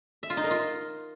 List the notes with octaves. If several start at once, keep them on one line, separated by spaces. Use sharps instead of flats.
E5
F4
D#4
A#4
F4